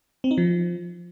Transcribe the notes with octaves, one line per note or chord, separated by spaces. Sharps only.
C4
D#4
F3